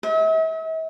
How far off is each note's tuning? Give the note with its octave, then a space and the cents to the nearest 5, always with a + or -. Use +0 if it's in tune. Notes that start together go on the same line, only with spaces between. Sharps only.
E5 -45